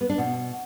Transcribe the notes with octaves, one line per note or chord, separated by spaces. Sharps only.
B3
D4
B2